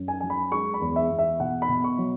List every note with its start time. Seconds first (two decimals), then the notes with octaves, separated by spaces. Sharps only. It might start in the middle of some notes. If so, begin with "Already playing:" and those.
Already playing: F#2
0.08 G#5
0.21 F#3 G#5
0.30 B5
0.52 G#3 C#6
0.74 B5
0.81 E2
0.96 E5
1.11 E2
1.19 E5
1.40 B2 F#5
1.62 B5
1.69 B2
1.84 C#6
1.98 F#3